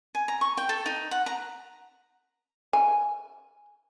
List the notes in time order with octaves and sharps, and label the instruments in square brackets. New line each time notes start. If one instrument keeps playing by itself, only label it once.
[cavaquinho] G#5
A#5
C#6
G5
A4
D#4
F#5
A#5
[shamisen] G#5